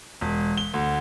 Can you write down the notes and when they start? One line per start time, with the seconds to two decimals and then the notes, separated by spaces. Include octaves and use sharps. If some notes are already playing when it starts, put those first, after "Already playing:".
0.21 E1
0.57 G7
0.74 D2